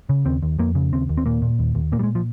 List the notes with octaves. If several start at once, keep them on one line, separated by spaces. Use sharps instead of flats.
C#3
D#2 C4
D#2
F2 A#3
C#3
D#2 C4
D#2
C4
A#2 A#3
A#2
D#2
D#2
A#2 A#3
G3
G#3
F3